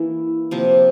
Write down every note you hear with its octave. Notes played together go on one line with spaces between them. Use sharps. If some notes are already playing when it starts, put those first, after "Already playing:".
Already playing: E3 A#3 E4
C3 F3 A#3